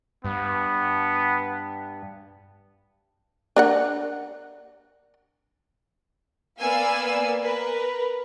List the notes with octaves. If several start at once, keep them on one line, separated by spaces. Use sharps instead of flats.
G2 B3
D4 A#4 F#5
A#3 B3 D5 F5 G#5 E6
A#4 B4